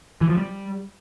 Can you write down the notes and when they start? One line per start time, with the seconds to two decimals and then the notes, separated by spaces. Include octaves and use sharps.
0.21 E3
0.29 F3
0.37 G3